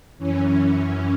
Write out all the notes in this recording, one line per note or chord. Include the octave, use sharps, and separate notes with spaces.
F#2 E3 C#4